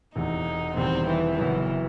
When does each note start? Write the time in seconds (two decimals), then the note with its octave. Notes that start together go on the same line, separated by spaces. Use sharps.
0.15 E1 E2 C3 D#4
0.76 E1 E2 C3 D#3 G3 C4
1.07 E3
1.37 F#1 F#2 E3 F#3 B3